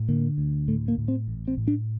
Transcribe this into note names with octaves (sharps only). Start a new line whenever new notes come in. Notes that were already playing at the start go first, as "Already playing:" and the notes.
Already playing: A2
D3 A#3
D2
A2 A3
A#3
A2
C4
A1
C4
A2
D4